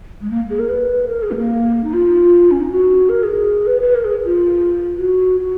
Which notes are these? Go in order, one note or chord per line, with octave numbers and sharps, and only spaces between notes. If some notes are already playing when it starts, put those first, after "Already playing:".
G#3
A#3
G#4
A#4
B4
A#4
G#4
G#3
A#3
D#4
F4
C#4
D#4
F#4
A#4
G#4
B4
B4
A#4
G#4
F4
F#4
F#4